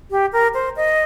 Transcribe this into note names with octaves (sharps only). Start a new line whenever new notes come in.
G4
A#4
C5
D#5